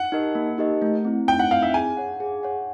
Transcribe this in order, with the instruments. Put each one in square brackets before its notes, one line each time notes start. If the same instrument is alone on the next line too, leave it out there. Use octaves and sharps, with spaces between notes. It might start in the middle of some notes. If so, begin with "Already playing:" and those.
Already playing: [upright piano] F#5
[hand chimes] D#4 G4 A#4 D#5
A#3
D#4 G4 A#4 D#5
A3
C4 E4
[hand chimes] A3 [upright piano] G5
[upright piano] F#5
[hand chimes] C4 E4 [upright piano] F5
[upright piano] E5
[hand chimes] G#4 [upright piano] G#5
[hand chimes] C#5 F#5
G#4
C#5 F#5